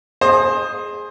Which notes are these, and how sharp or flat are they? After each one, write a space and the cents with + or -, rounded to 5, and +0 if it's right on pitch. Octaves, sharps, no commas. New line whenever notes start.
G#4 +0 C5 +20 D#5 -20